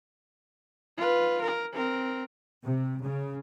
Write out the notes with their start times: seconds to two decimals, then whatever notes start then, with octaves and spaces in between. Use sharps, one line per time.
0.98 F4 B4
1.42 A#4
1.73 C4 A#4
2.64 C3
3.03 C#3